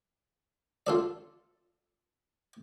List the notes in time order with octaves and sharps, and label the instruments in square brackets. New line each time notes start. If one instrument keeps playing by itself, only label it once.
[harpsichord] F4 A4 D5